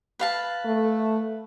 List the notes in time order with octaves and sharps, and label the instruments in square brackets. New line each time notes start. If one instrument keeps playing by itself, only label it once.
[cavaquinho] B4 F5 A5
[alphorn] A3